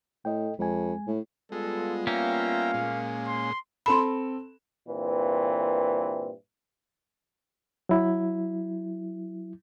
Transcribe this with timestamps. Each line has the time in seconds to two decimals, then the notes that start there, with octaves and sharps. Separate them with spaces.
0.25 A2 A4 D#5 G5
0.59 F2 G#3 G#5
1.07 A2
1.52 G3 G#3 B3 F4 A4
2.07 A#3 C#4 E5 F5 G5 A#5
2.74 A#2 G#3
3.27 C6
3.86 C4 A4 B5 C6 E7
4.87 G2 A#2 E3 C4
7.89 F#3 E4